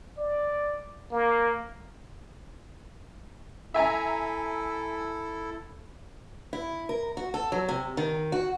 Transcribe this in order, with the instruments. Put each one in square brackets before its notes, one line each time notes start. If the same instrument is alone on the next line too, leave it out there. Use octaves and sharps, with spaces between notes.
[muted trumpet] D5
A#3
[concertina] E4 A4 [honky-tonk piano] E5 G#5 A#5
[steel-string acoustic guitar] E4
A#4
F#4
A4
F#3
C3
D#3
F#4